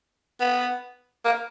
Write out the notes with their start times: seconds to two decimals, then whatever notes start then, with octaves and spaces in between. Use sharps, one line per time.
0.40 B3
1.25 A#3